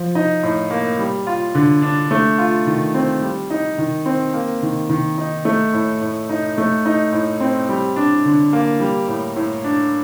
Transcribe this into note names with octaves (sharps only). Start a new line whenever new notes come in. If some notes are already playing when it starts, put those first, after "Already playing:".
Already playing: F3
D#4
A2
A#3
G3
F4
D3
D4
A3
F4
D#3
C4
G3
D#4
D#3
C4
A#3
D#3
D#3
D#4
A3
A2
A2
D#4
A3
D#4
A2
C4
G3
D4
D3
A#3
G3
A2
A2
D4